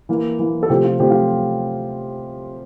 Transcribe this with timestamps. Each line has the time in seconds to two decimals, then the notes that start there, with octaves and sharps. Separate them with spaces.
0.09 E3 A#3
0.39 E3 A#3
0.63 A4
0.70 C3 F3 A3 C4 G4
0.84 F4
1.00 C3 F3 A3 C4 G4
1.10 F4